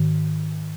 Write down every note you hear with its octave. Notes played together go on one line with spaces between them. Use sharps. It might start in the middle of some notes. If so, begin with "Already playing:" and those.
Already playing: G#2 D#3